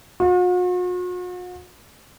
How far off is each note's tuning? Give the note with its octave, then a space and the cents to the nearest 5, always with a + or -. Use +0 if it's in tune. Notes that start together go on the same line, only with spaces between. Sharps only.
F#4 -45